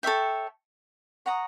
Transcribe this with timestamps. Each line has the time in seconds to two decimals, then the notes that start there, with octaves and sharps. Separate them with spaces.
0.03 A4 C#5 E5 G5
1.26 C#5 F#5 A#5 D#6